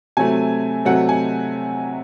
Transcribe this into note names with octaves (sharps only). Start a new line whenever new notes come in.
C3 F#3 A3 C4 G#5
C3 F#3 A3 C4 F#5
G#5